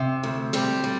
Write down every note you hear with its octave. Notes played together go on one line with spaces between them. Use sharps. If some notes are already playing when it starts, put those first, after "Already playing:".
Already playing: C3
D2
G3 C4
G3